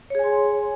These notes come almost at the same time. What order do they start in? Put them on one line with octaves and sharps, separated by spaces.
C#5 G#4 G#5 C6